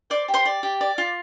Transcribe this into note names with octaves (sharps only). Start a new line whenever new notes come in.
C5 D5 D6
G4
C5 C6
D5
G4
D5
F4